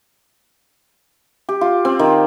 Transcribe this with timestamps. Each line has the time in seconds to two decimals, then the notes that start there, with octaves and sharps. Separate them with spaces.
1.49 G4
1.61 F4
1.85 C4
1.99 D#3